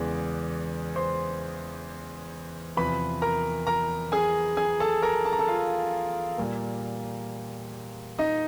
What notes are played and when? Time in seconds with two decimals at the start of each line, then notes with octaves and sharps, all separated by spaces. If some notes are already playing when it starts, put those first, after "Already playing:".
Already playing: E2 C#3 E3 G#3 B3 D5
0.96 C5 C6
2.77 E2 C3 F3 B4 B5
3.22 A#4 A#5
3.67 A#4 A#5
4.12 G#4 G#5
4.57 G#4 G#5
4.80 A4 A5
5.02 A#4 A#5
5.25 A5
5.32 A#5
5.39 A4 A5
5.48 F4 F5
6.38 A#2 G3 A#3
8.19 D#4 D#5